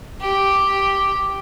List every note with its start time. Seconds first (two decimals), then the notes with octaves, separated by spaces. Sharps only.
0.21 G4